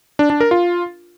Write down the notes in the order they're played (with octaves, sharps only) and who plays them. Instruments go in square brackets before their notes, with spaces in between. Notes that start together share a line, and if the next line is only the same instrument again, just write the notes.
[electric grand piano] D4
D4
A#4
F4